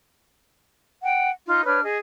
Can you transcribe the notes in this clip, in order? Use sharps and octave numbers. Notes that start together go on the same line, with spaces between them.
F#5 G5
D#4 F4
D4 B4 C#5 F6
G#4 D#5